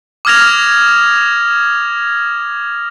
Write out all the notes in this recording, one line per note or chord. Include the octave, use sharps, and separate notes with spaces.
D6 D#6 F6 G#6 A#6 F7